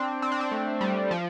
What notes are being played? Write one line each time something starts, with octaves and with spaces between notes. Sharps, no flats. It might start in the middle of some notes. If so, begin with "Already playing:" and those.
Already playing: C4 D4
C4
D4
C4
A3
G3
F3